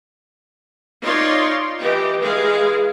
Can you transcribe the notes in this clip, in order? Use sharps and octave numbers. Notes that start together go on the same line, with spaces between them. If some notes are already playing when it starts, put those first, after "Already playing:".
D#4 F4 C#5 D5 F5 C6
E3 G4 D#5
E3 G#3 G#4 F5